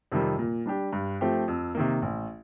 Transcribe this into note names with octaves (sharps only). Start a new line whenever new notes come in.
F2 C3 D#3 G3
A#2
G3 D4 G4
G2
F3 A3 C4 G4
F2
C3 D#3 A#3
A1